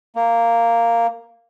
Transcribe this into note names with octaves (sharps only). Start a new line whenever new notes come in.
A#3